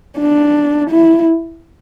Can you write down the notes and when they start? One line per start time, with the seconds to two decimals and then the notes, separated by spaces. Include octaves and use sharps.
0.19 D4
0.90 E4